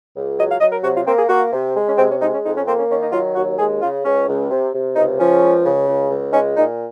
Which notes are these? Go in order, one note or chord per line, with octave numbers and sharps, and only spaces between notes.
C#2
F#3 D#5
F5
F#3 D#5
A#4
C3 F#4
F4
A#3 C4
G#4
A#3 F#4
C3
G#3
C#4
C3 C4
C#4
G#3 D#4
C#4
F2 D#4
C#4
A#3 C4
C#4
D#3 C#4
D#4
F#3 F4
D#2 F#4
G#3 G#4
C#3 F4
C#2 C#4
C#2
C3
C3
C#2 D#4
F3 C#4
C#2
C#3
C#2
C#2
D#4
G#3 C#4
A#2 D#4